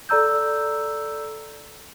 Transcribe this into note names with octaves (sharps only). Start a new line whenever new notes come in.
A4 D5 A#5 E6 G6